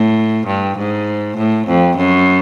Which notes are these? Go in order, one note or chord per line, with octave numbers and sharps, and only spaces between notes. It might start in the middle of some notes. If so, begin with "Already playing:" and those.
Already playing: A2
G2
G#2
A2
F2
F#2